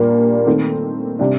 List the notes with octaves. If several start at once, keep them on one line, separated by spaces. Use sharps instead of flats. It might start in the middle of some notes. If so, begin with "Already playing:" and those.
Already playing: A#2 G3 A#3 D4
D#3 A3 C4
C3 G3 D4